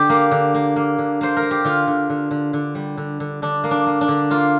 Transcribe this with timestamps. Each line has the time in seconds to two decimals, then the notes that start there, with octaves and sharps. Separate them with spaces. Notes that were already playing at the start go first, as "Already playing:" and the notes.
Already playing: D3 G4
0.10 A#3
0.31 D3
0.54 A#3
0.76 A#3
0.98 D3
1.21 A#3 C5
1.37 A#4
1.42 A#3
1.51 G4
1.65 D3 F4
1.87 D3
2.10 D3
2.31 D3
2.53 D3
2.75 G3
2.98 D3
3.20 D3
3.42 D3 D4
3.64 A#3
3.71 D4
3.86 A#3
4.01 D4
4.08 D3
4.31 A#3 F4